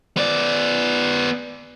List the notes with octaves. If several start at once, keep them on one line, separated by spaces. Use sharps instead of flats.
B3 D5